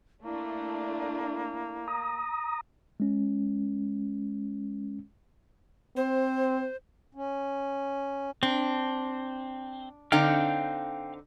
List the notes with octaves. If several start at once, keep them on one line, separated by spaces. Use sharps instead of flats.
A3 A#3 D4 E4
A#5 D#6
G#3 C#4
C4 C5
C#4
C4 D4
D3 C4 D#4 F5 G5 F6